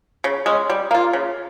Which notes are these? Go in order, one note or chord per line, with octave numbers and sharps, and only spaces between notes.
C#3
G#3 C#4
G3
A#3 F4
C#3